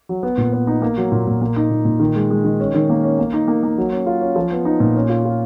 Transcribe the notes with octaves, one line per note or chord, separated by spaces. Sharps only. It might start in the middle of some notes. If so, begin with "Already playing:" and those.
F#3
B3
A#2
B3
D#4
A#3
F#3
A#2
A#2
A#3
D#4
A#2
A#2
D#3
G#3
G#3
D#3
C#4
D#3
A#3
C#4
A#3
D#4
A#3
A#3
F#3
C#4
F4
C#4
F3
B3
D#4
A#2
C#4
F4
F4